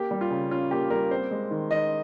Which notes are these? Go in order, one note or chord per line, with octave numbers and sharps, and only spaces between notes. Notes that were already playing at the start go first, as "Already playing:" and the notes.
Already playing: A#3 G4
G3
F4
C#3
C#4 F4
A#3 G4
G3 A#4
C4 C5
G#3
D#3
D#3 D#5